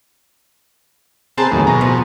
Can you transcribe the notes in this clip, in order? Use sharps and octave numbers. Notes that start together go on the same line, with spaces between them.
C4 G#4 A#4 B4 A5
D#2 A2 E3 F#3
B2 A#5 C#6 A#6
F3